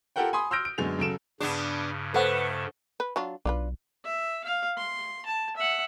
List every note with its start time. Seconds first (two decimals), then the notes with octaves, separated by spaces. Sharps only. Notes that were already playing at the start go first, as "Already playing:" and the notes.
0.16 F4 G4 A4 A#4 F#5 G5
0.33 G#5 B5 C6 D#6
0.51 C6 E6 F6 G6 A#6 D7
0.65 D7
0.78 F#2 D3 G#3 B3 F7
0.99 C#3 F#3 A4 D7 E7
1.40 G2 C#3 B3 D4 G#4
2.14 A3 A4 B4 C5 F#5
3.00 B4
3.16 F#3 D4 F4
3.45 B1 D4 F4 B4
4.04 E5
4.44 F5
4.77 C6
5.26 A5
5.56 E5 F#5